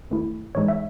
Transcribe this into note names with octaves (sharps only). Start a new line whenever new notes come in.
E2 D#3 A3 E4
A2 E3 G#3 D#4 C#5
E5